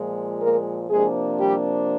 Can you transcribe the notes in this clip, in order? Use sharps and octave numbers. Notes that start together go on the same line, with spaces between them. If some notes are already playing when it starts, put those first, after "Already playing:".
Already playing: A#2 F3 G#3
A#3 A#4
C3 F3 G#3 A#3 D4 G#4
G3 G4